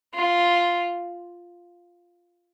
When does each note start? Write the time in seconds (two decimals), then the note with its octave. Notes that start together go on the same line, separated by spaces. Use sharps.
0.14 F4